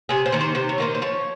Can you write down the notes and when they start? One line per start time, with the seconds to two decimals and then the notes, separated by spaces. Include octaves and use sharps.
0.09 C3 G#4
0.26 C5
0.32 D#3 A#3 D#4
0.41 C5
0.55 C3 C5
0.69 C#5
0.78 D#3 A#3 D#4 C5
0.95 C5
1.02 F3 C#5